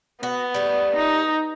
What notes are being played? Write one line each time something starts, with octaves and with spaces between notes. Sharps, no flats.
B3 F#4
G3 A3
D#4